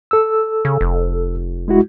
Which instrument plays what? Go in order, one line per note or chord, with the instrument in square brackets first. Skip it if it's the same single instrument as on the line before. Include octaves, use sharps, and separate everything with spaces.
[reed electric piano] A4 E6
[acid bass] C#3
F1
[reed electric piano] G#3 E4 F#4